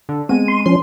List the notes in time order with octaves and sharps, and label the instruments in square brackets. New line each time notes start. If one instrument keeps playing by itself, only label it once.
[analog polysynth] D3
[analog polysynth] G#3 D#7 [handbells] B3 C4
[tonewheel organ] C6
[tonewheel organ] F3 C#4 [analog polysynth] C6